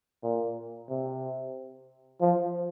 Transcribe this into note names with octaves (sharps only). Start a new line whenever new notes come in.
A#2
C3
F3